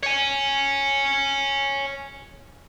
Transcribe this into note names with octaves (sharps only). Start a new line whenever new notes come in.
C#5 G#5